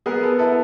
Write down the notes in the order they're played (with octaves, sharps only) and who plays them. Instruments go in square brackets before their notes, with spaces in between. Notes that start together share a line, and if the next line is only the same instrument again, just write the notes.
[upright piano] B3 [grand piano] G#4 A#4
[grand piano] A4 B4
[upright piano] E4 [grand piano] A4 B4